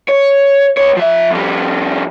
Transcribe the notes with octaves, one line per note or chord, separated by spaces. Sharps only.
C#5
C#2 C#5
F3 E5
F2 G3